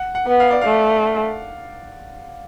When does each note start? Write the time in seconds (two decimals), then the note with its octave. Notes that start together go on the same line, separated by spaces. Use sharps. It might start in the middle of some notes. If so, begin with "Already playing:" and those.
Already playing: F#5
0.15 F#5
0.27 B3
0.40 F5
0.51 D5
0.62 A3 F5